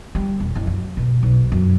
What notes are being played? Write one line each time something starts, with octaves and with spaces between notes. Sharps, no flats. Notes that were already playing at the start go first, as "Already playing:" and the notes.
G3
E1
F#1
F#3
B2
B1
F#2